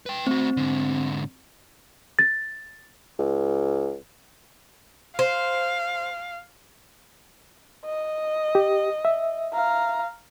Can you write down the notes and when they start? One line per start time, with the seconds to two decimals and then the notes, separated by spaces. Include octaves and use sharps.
0.06 B4 G5
0.27 A3 C4 F#4
0.57 G#2 D3
2.19 A6
3.19 C#2
5.19 C5 F5
7.85 D#5
8.55 G4
9.05 E5
9.54 F5 A#5